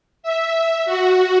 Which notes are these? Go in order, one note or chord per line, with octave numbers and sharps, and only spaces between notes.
E5
F#4